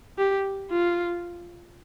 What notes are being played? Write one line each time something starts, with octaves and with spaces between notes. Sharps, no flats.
G4
F4